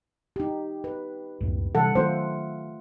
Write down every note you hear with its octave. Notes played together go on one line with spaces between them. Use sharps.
D#4 G4
B4
C#2 F#2 A2
C3 E3 G3 A4 F#5
D#3 F#3 A3 C#4 F4 A4 C5